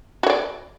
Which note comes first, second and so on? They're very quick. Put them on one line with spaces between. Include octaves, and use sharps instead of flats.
F#4 C#5 D5